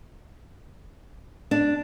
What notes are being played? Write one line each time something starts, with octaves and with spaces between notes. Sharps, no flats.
D4